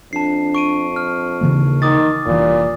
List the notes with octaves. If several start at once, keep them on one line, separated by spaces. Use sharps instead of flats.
F2 D4 A5 C7
C#6 D7 D#7
F6
A#1 D#2 C#3 E3 A#3
D#3 D6 D#6 A6
F1 G2 A#2 E3